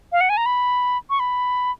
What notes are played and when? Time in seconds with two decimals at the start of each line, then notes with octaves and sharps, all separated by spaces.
0.12 F5
0.21 F#5
0.29 G#5
0.37 A#5
0.46 B5
1.10 C#6
1.20 B5